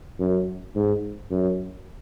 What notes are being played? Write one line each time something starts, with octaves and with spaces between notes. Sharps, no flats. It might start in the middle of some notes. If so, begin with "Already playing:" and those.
F#2
G#2
F#2